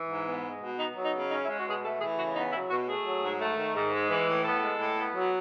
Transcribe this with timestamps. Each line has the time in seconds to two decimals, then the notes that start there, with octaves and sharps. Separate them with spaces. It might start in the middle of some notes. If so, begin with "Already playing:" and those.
Already playing: E3
0.08 G#2
0.26 B3
0.44 G#3
0.61 B2
0.78 B3 D#4
0.95 F#3
1.05 D#4
1.14 C#3
1.30 C#4 D#4
1.44 E4
1.49 G#3
1.57 F#4
1.66 B2 G#4
1.84 A3 A4
2.01 E3 G#4
2.17 C#3 F#4
2.36 B3 D#4
2.53 F#3 E4
2.70 B2 F#4
2.88 A3 G#4
3.05 F#3
3.22 G#2
3.40 A3
3.57 D#3
3.75 G#2
3.92 G#3
4.10 E3
4.28 A2
4.45 B3 A4
4.62 G#3
4.79 A2
4.97 B3
5.15 F#3